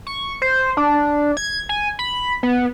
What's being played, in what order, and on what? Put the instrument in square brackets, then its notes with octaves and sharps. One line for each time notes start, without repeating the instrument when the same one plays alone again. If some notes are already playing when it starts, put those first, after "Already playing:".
[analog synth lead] C#6
C5
D4
G#6
G#5
B5
B3